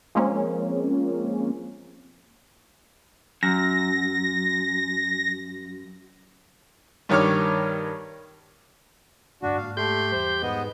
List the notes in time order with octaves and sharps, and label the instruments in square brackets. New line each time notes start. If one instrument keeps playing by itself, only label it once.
[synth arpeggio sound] F3 G#3 A#3 C4 C#4
[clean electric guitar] F#2 [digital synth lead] A#6
[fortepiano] G2 D#3 C#5 D6 F6
[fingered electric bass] D2 G2 [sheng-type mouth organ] D4 F#4
[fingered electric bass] G#2 A#3 [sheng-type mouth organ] F5
[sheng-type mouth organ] A3 C6 [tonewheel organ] G4 G6
[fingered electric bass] E2 G3 [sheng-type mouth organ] C5
[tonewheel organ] G#2 [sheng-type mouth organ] B3 D#5